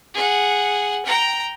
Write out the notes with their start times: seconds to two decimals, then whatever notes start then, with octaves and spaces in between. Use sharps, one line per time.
0.14 G#4 F#5
1.05 G5 A#5